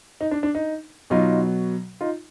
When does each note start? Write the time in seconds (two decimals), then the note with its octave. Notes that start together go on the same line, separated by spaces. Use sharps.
0.21 D#4
0.31 D4
0.43 D4
0.55 D#4
1.10 B2 F#3 D#4 F4
2.01 D#4 F4